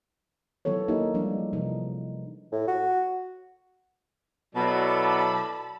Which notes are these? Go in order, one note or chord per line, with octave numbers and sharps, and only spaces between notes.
D#3 E3 F#3 B3 A4 C#5
A#3 D#4 E4 G4 A#4
F3 G3 G#3 D4
C3 E3 F3 D#4
A2
F#4
B2 F#3 E4 A4 D5 A5 B5